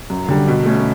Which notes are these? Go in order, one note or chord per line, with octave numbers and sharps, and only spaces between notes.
F#2
D3 G3
B2
A3 C#4